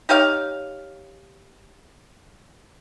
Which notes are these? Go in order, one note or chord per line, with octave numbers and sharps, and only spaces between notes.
D#4 G4 C#5 F5